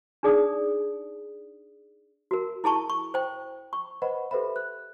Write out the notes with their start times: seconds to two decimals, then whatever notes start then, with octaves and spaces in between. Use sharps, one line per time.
0.23 D4 D#4 G#4 D5 D#6
2.31 F#4 A#4
2.64 E4 G#4 A5 C#6
2.90 C#6
3.14 C5 G5
3.73 C#6
4.02 B4 C5 D#5 F#5 B5
4.31 G4 A4 B4 C5 E5 B5
4.56 F#6